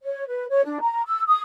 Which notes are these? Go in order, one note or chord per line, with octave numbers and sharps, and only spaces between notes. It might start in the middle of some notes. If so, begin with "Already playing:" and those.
C#5
B4
C#5
D4
A#5
E6
D#6